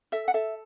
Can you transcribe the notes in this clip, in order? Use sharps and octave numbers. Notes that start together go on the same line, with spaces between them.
A4 E5
F#5
A4 E5